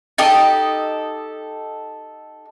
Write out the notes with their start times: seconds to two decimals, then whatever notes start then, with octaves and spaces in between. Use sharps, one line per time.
0.18 D#4 G4 A4 D#5